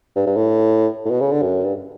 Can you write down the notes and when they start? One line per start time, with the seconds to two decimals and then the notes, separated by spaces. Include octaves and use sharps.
0.16 G2
0.27 G2
0.37 A2
1.05 A2
1.10 B2
1.21 C#3
1.32 D3
1.42 F#2
1.65 G2